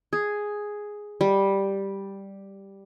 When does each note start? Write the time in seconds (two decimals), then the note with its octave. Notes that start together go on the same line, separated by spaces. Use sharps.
0.13 G#4
1.21 G3